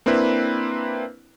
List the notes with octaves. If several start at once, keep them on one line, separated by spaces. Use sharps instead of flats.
A#3 C4 D4 E4 B4